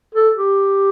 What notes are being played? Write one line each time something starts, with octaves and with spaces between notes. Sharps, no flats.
A4
G4